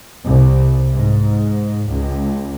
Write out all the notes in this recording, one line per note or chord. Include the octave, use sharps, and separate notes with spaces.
C2
G#2
C#2